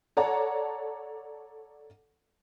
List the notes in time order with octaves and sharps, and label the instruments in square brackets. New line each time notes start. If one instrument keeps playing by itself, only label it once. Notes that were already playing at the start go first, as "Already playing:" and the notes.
[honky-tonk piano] A4 C#5 D5 F#5 A5 A#5